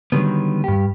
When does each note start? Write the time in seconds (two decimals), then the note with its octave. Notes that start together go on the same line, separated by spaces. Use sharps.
0.12 D3 D#3 F#3 G3 B3
0.64 G2 G4